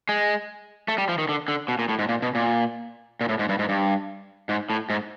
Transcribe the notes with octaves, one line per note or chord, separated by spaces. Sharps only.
G#3
A3
G3
F3
D#3
D3
D3
B2
A#2
A2
G#2
A#2
B2
A#2
A#2
A2
G#2
G2
G#2
G2
G#2
A2
G#2